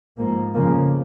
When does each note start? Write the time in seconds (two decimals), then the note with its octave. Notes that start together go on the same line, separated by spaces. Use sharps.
0.17 G#2 F3 A#3
0.54 F2 C#3 F3 A#3